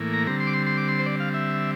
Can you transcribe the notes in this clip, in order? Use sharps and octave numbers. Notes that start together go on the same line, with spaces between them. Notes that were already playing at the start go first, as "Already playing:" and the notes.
Already playing: A2 E3 A#3
A#5
D3 G3 C4 A#5
C6
D6
C6
C6
D6
C6
C5
D5
F5
E5